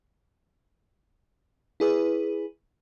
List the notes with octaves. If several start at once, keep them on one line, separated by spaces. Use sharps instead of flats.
E4 G#4 B4